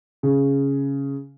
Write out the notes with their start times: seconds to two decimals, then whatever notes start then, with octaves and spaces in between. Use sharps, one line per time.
0.23 C#3